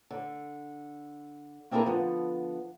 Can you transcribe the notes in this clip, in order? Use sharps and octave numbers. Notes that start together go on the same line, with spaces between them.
D3
A#3 C4 D4 E4 G#4 A#4
D3 F3 B3